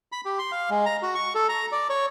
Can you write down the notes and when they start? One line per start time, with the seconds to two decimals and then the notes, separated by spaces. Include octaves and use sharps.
0.12 B5
0.25 G4
0.39 C6
0.52 F5
0.70 G#3
0.86 A#5
1.03 F#4
1.15 C#6
1.35 A4
1.49 A#5
1.72 D5
1.90 C#5